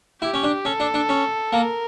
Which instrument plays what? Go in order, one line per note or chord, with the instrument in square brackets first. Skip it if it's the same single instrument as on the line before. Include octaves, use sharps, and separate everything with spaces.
[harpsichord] E4 [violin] G4
[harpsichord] C#4
D4
[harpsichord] C#4 [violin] A4
[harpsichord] D4
D4
C#4
[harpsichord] A#3 [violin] A#4